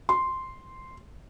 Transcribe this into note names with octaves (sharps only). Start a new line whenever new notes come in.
C6